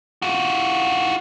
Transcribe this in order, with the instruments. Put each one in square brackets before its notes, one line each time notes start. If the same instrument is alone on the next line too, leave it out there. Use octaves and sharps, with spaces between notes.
[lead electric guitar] F4 F#4